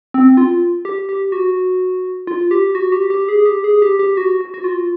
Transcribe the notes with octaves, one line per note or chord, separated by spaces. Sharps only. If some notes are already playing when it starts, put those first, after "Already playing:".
C4
F4
G4
G4
F#4
F4
G4
F#4
G4
G4
G#4
G4
G#4
G4
G4
F#4
F#4
F#4
F4